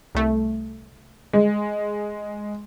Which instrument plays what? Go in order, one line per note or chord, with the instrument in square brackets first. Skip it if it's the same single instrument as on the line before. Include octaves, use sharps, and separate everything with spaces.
[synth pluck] C2 A3
[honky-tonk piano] G#3